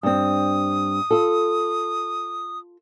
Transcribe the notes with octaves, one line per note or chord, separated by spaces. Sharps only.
G2 C4 D#6
F4 A4